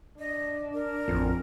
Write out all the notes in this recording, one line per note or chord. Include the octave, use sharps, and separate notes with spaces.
D4 D#5
A#4
A1 F2